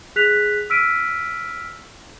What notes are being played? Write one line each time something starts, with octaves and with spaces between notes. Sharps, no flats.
G#4 F#6 B6 F7
E6 F6 B6 D7 D#7